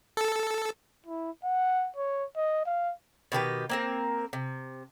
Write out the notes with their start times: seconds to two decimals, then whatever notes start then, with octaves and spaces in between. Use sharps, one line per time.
0.17 A4
1.06 E4
1.44 F#5
1.97 C#5
2.36 D#5
2.65 F5
3.32 B2 D#3 G4 B4
3.69 A#3 C4 A#4
4.33 C3